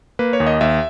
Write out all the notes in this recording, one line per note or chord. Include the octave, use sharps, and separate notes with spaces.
A#3 B4
C#5
D#2
D#5
D#2 E5